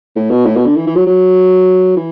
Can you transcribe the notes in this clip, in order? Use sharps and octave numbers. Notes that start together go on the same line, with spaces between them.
A2
B2
A2
B2
D3
E3
E3
F#3
F#3
E3